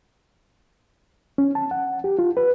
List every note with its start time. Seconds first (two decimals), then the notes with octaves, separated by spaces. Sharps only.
1.38 C#4
1.55 A5
1.71 F#5
2.04 G4
2.19 F4
2.37 B4